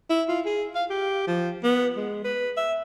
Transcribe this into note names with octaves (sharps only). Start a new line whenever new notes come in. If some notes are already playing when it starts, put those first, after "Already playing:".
E4
F4
G#4
F5
G4
F3
B3
G#3
B4
E5